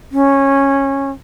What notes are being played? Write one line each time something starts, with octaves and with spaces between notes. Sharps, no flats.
C#4